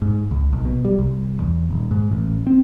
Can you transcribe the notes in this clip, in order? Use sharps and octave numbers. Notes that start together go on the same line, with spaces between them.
G#2
C#2
B1
B2
G3
C2
E2
D#1
G#2
A1
C4